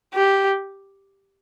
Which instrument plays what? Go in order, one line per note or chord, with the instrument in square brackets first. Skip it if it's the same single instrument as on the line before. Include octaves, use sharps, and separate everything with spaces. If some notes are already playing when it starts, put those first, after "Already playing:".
[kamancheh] G4